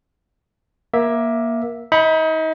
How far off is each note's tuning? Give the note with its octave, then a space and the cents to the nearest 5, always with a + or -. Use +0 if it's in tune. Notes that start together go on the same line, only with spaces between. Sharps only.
A#3 +20 E5 +0
D#4 +35 B5 +0